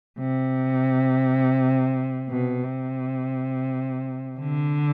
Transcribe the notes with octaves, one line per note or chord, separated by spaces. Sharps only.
C3
B2
C3
D3